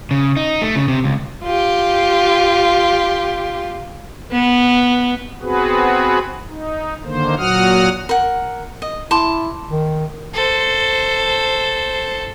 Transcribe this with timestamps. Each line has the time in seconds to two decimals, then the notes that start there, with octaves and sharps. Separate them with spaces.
0.11 C#3
0.37 D#4
0.62 A3
0.75 C#3
0.88 C3
1.04 C#2
1.44 F4 G4
4.32 B3
5.42 B3 C4 F#4 G#4 B4
6.48 D#4
7.04 D3 D#3 A#3 C5
7.37 A#2 F#3 F#4 F#5 D#6 F6
8.09 A#4 F#5
8.82 D#5
9.11 E4 A5 C6 D6
9.70 D#3
10.34 A4 C5